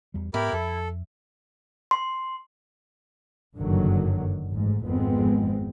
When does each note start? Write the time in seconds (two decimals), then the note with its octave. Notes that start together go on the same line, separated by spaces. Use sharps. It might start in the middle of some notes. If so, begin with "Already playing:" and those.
0.14 E2 G3
0.34 G#2 B3 E4 G4 A#4 B5
0.53 F2 A4
1.91 C6
3.56 F#1 G2 D3 D#3 F#3
4.49 A1 G#2
4.86 G#1 F2 G#3 B3 C4